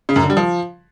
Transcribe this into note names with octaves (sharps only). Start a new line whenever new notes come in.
C#3
F#2
D3
G3
F3